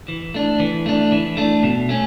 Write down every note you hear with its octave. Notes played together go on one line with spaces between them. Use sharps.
E3
A3 D4
E3
A3 D4
E3
A3 D4
B2
A3 C#4